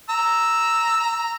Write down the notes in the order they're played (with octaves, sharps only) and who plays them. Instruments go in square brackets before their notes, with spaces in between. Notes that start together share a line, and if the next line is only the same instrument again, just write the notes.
[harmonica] A#5 E6